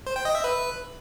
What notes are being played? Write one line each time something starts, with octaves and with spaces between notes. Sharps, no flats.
C5
G5
D#5
E5
B4